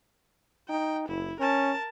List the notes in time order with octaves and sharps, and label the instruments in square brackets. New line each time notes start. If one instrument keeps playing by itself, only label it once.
[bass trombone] D#4 [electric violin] G5
[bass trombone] F#1 [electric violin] E4
[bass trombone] C#4 [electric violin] A#4 A5